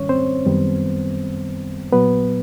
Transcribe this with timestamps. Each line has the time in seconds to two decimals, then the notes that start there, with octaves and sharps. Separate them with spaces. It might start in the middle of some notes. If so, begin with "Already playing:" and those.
Already playing: G#2 D#3 G3 C#4 C#5
0.09 C4 C5
0.46 F#2 D#3 G3 B3
1.92 A#2 F#3 B3 B4